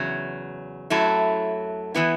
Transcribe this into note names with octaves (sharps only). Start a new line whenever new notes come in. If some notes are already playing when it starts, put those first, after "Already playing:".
Already playing: E2 C#3 F#3
F#2 F#3 A3 E4
E3 B3 E4